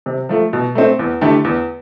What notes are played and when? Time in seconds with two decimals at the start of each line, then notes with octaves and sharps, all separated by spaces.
0.06 C3
0.29 F3 A3
0.53 B2
0.75 A3 C4
0.99 E2
1.21 D3 A3 E4 G4
1.44 E2